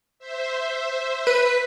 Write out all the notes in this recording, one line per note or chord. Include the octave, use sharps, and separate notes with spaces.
C5 E5
B4